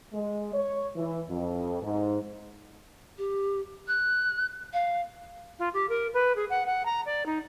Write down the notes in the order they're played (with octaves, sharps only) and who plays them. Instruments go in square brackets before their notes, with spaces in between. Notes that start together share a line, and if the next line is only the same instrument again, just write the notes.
[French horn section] G#3
C#5
E3
F2
G#2
[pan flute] G4
F#6
F5
[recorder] F4
G4
A#4
B4
G#4
F#5
F#5
A#5
D5
D#4